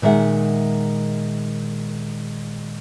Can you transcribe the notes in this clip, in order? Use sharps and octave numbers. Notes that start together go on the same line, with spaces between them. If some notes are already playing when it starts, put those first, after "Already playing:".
A#2 D#3 G#3 E5 F#5